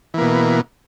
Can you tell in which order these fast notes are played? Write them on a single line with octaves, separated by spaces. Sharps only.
E3 A#3 B2